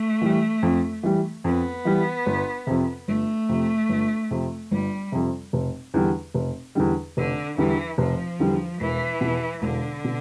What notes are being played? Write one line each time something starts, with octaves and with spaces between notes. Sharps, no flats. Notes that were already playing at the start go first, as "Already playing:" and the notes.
Already playing: A3
E3 G3
F2
E3 G3
F2 B3
E3 G3
G1
F2 C3
G1 A3
F2 C3
G1
F2 C3
G1 G3
F2 C3
F1
E2 D3 G3
F1
E2 D3 G3
F1 D3
E2 D3 E3 G3
F1 F3
E2 D3 G3
E1 E3
E2 B2
E1 D3
B2